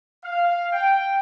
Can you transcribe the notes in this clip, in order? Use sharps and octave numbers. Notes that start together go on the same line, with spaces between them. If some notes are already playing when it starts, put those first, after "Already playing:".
F5
G5